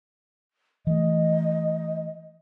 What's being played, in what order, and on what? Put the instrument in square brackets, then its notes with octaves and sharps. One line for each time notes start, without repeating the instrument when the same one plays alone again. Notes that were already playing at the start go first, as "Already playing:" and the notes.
[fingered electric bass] E3 A3 [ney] D#5